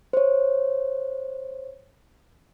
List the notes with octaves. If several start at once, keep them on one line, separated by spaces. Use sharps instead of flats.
C5 C#5